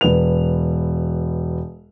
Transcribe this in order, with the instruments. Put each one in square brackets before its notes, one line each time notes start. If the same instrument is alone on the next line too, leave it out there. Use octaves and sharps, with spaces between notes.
[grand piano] E1 B4 F7